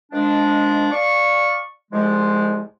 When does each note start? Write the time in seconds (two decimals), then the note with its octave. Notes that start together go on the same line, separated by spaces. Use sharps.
0.12 D#3 F3 G#3 D4
0.91 D5 F5 C#6
1.91 C2 G#2 F3 G#3